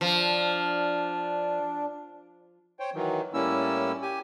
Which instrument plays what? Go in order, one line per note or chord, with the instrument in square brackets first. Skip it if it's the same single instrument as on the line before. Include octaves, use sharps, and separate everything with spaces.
[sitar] F3 [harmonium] D4
[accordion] C5 C#5 G5
D#3 E3 F#3
A2 G3 A#3 C#4 E4 E6
G4 G#5